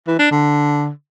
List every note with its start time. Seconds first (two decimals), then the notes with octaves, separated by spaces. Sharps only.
0.07 E3
0.19 D4
0.31 D3